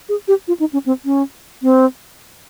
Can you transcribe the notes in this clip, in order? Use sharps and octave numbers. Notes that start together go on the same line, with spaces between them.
G#4
G4
F4
D#4
C#4
C4
C#4
C4